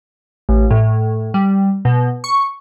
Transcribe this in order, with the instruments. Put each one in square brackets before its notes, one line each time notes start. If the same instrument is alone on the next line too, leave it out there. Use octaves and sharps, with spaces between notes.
[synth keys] A1
A2
G3
B2
C#6